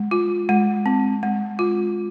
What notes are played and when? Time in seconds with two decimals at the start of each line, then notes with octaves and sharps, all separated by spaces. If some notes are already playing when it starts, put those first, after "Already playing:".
Already playing: G#3
0.11 F4
0.49 G#3
0.86 C4
1.23 G#3
1.59 F4